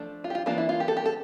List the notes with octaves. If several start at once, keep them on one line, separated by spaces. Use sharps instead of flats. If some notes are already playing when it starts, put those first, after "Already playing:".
Already playing: F3 A3 D4
F4
G4
F4
E3 A#3 D4 F4
E4
F4
G4
A4
G4
A4